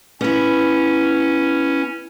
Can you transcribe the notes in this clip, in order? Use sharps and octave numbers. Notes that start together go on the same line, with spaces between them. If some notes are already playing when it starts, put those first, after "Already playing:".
B3 C#4 E4